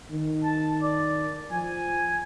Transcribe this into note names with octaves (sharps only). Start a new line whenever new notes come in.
D#3
A5
D5
F3 G#5